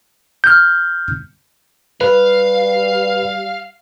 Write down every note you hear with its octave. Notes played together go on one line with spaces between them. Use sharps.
F6 G6
G3 B4 F5